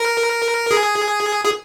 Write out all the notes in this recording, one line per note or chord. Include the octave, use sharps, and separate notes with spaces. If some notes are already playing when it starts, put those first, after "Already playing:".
Already playing: A#4
G#4
G#4